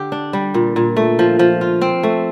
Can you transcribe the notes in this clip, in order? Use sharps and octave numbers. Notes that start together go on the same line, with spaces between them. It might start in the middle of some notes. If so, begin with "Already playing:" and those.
Already playing: D3 G4
D4
G3
A#2
A#2
A3
F3
F3
F4
C4
A3